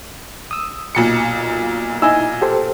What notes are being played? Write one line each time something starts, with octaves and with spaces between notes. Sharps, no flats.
D#6 E6
B1 A#2 C#7
D#4 E4 D#5 G#5 E6
G4 A4 C5